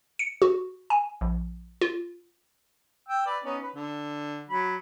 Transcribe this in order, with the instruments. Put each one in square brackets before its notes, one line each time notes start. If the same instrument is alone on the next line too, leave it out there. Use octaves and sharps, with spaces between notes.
[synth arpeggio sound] C#7
F#4
G#5
A#1
F4
[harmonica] G5 E6
B4 D5
B3 C#4 D#4
B4
D3
F#3 B5